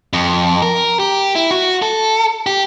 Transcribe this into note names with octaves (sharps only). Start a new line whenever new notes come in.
F2
A#4
G4
E4
F#4
A4
G4